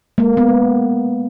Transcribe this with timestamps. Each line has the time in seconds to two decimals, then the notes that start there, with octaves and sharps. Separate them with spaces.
0.18 G#3 A#3
0.33 G#3 B3
0.48 G#3